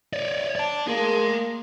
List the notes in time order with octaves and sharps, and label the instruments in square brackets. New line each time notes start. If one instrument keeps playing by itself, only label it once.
[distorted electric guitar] C#5 D5
D5 A5
[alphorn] A#3 [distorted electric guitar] G#4 C6